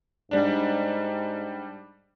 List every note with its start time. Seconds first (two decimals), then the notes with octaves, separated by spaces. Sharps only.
0.31 G#2 G3 D4